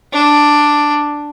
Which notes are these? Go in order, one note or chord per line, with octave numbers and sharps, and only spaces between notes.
D4